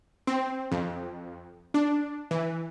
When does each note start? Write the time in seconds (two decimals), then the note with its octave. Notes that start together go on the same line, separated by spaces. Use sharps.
0.27 C4
0.71 F2
1.74 D4
2.31 E3